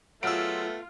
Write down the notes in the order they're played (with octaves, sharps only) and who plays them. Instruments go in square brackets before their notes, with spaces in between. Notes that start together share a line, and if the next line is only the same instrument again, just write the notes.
[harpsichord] F#3 G#4 [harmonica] A3 B3 [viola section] F4 [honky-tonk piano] E6 F6 D7